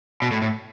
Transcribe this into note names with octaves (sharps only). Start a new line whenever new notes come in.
B2
A2
A2